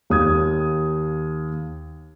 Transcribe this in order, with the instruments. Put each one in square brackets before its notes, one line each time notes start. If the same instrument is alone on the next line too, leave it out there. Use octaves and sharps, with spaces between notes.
[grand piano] D#2 D#6 G#6